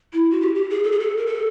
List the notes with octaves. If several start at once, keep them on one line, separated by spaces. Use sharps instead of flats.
E4
F#4
G4
G4
G#4
A4
G#4
A4
A#4
A4